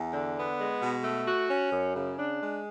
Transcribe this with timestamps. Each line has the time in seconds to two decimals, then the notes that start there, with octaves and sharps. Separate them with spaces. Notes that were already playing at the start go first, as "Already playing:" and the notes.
Already playing: E2
0.13 D3
0.36 B3
0.58 G#3
0.81 B2
1.04 A3
1.27 F#4
1.50 C#4
1.72 F#2
1.95 C#3
2.18 D4
2.41 G#3